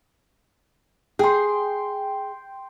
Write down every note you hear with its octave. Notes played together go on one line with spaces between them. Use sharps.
G#4 G5 C6